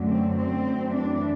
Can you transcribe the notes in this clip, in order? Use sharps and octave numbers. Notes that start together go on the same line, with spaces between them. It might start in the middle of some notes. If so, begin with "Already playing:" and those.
Already playing: F#2 D3 F#3 A3
C4
C4
F#2 E3 A3 D4